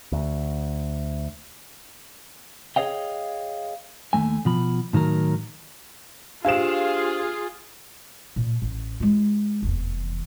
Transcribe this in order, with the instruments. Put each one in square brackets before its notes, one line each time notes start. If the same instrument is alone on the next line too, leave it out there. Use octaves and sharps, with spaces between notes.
[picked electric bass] D2
[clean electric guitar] G#4 A4 C#5 D#5 F5 G5
D#2 F#3 A3 G#5
B2 F3 B5
A2 D#3 F#3 A#4
[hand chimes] D4 G4 C5 [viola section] F4 G#4 [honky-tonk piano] F5 E7
[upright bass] A#2
A1
G#3 F4
F1 E2